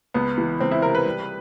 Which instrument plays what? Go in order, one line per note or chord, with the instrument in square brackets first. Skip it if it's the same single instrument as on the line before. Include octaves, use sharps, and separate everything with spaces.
[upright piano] C#2 B3
E3
C#2 C4
E4
C3 A#4
B4
G3